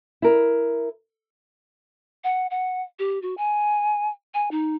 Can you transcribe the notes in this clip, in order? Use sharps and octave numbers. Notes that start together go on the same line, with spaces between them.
E4 A#4
F#5
F#5
G4
F#4
G#5
G#5
D#4